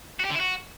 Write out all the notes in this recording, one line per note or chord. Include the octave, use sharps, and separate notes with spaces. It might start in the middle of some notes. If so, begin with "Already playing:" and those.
F#4
G4
D3
E4
F#4